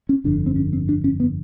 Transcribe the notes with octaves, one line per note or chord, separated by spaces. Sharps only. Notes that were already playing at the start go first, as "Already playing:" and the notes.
C#4
G1 F2 D3 D4
C4
C#4
C4
D4
C#4
B3